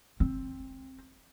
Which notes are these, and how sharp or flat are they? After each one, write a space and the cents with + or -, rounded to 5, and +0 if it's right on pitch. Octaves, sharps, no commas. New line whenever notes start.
C4 +15